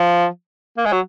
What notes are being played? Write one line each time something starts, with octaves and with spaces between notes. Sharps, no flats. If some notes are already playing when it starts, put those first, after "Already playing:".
Already playing: F3
A#3
G#3
F#3